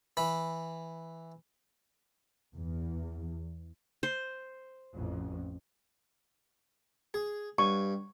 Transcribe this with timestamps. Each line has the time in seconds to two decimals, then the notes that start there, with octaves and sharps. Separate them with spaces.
0.17 E3 B5
2.55 E2
4.03 C5
4.95 A1 F2
7.14 G#4
7.58 G2 C#6